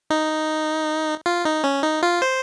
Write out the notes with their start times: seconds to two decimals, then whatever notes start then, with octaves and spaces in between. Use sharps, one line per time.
0.10 D#4
1.26 F4
1.45 D#4
1.64 C#4
1.83 D#4
2.03 F4
2.22 C5